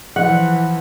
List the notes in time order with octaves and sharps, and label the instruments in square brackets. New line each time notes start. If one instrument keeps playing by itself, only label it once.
[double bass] E3 F3 [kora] F#5